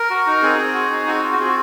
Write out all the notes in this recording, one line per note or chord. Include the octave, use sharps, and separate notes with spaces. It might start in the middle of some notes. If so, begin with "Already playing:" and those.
Already playing: A#4
F#4
D#4
C4 G#4
C4
F#4
D#4
C4 F#4
F4
F#4
C4 G#4
F#4